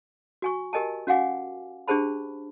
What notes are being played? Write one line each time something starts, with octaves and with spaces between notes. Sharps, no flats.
F#4 G#5 C#6
G4 A#4 D#5 G#5 A5
C#4 F#4 F5 F#5 G#5 D6
D4 G4 G#4 C5 A5 B5